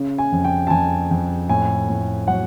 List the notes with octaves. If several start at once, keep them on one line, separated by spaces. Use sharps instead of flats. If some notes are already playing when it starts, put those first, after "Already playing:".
Already playing: C#3
G#5
F2
G5
A5
F2 G#5
F2
A2 G#5
A2
F#3 F#5